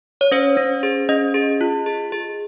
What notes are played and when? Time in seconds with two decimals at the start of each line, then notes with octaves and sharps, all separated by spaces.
0.21 C#5
0.31 C#4 C5
0.57 C#4
0.83 G#4
1.09 C#4 D#5
1.34 G#4
1.61 F4
1.86 G#4
2.12 G#4